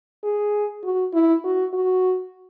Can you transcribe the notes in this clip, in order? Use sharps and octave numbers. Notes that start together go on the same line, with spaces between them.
G#4
F#4
E4
F#4
F#4